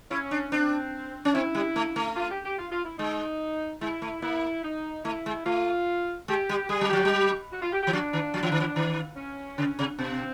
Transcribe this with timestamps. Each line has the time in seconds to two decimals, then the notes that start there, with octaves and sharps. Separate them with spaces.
0.10 C#4 E4
0.31 D4
0.52 C4 D4
1.25 C#4
1.34 C4 E4
1.55 G3
1.76 A3
1.96 A3
2.16 F4
2.31 G4
2.44 G4
2.58 F4
2.72 F4
2.85 E4
2.99 G#3 D#4
3.81 G#3 E4
4.02 A3
4.22 A#3 E4
4.63 D#4
5.05 A3 E4
5.26 G#3
5.45 A3 F4
6.28 G#3 G4
6.49 G3
6.69 G3 G#4
6.81 F#3
6.90 F3 G4
7.05 F#3
7.53 F#4
7.62 F4
7.73 G4
7.83 E3 G4
7.93 F3 D4
8.13 D#3
8.34 F3
8.43 E3
8.52 D#3
8.60 E3
8.76 D#3
9.16 C#4
9.58 C#3
9.79 C3
9.99 B2 C4